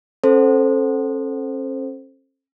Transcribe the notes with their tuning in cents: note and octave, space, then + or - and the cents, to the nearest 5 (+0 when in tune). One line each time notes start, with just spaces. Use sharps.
C#4 -45 A4 +0 C5 +0